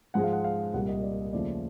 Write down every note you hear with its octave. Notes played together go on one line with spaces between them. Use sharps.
G#2 F3 G#3 F#5
F5
F#5
F5
C2 A#2 G3 A#3 F#5
D#5
D5
D#2 C#3 F3 A3 D5